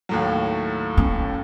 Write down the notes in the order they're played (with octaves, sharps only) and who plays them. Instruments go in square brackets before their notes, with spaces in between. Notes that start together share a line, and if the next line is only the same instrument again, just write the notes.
[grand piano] D#2 A2 F#3
[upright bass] C#4